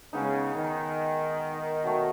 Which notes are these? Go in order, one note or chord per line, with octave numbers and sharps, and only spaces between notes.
C#3 G#3 B3 D#4
D#3
B2 F#3 A3